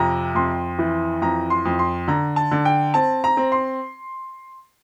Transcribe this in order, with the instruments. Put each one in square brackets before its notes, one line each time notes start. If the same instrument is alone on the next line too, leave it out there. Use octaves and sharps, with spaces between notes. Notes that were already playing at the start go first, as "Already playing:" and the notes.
Already playing: [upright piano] F2 C3 A#5
F2 C6
E3
F2 A#5
C6
F2
C6
D3 A#5
A5
D3
G5
C4 A5
A#5
C4
C6